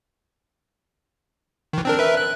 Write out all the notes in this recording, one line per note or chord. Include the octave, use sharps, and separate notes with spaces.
D#3 E3
C4 D4 A#4
A#4 B4 E5
F#6